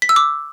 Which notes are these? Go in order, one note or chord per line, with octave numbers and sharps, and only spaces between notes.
B6
E6
D6